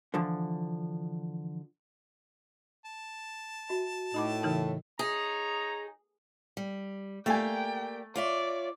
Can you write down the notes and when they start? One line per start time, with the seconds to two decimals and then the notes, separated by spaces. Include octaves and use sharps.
0.14 D3 E3 F3
2.85 A5
3.69 F#4 E5 B5
4.14 A2 D#4 D#5 B5 D6
4.43 C#3 E3 D#4 A#4 G5
4.99 D#4 G#4 C#5 A#5
6.57 G3
7.26 A3 A#3 G4 D5 G5 G#5
8.15 F4 C#5 D5 E5